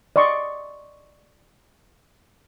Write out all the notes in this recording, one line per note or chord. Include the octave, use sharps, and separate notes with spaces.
D5 D#5 C6 C#6